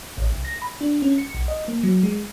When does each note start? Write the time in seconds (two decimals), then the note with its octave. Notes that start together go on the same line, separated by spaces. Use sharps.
0.18 A1
0.33 C2
0.45 A#6
0.62 B5
0.81 D4
1.02 C#4
1.18 C#7
1.35 B1
1.48 D#5
1.68 A#3
1.83 F#3
2.03 G#3